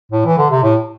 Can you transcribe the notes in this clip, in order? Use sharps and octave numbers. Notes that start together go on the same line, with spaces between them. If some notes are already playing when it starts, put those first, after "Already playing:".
A2
E3
D3
C3
A2